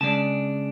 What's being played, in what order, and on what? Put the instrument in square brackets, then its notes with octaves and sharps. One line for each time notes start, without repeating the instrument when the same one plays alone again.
[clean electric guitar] C#3 G#3 D4 A5